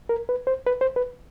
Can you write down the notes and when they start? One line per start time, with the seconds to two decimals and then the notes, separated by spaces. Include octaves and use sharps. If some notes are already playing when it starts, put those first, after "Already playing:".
0.09 A#4
0.29 B4
0.47 C5
0.67 B4
0.81 C5
0.96 B4